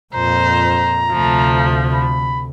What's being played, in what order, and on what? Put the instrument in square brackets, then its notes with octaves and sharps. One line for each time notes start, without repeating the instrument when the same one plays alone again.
[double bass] F2 A#2 [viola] C5 [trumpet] A#5
[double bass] D2 C3 [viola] F3 A3
[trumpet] B5